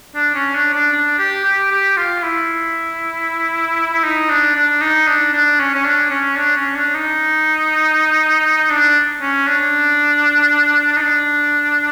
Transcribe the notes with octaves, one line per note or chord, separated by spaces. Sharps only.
D4
C#4
D4
D4
D4
G4
G4
G4
F4
E4
E4
D#4
D4
D4
D#4
D4
D4
C#4
C#4
D4
C#4
D4
C#4
D4
D#4
D4
C#4
D4
D#4
D4